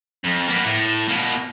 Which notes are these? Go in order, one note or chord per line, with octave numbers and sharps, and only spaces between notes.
F2
A#3 B3
A2
B2 A#3